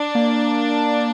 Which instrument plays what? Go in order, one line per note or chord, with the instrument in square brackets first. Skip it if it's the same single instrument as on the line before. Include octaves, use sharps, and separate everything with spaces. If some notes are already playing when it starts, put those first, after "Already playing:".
Already playing: [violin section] D4
[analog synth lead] A#3